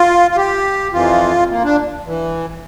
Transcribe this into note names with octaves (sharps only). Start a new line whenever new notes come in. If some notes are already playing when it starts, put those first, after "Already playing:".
Already playing: F4
F4
G4
F2 E3 F4
A#3
D4
E3